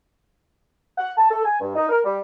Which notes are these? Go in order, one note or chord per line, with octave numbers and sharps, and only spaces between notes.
F#5
A5
A4
G#5
G2
D#4
A#4
G3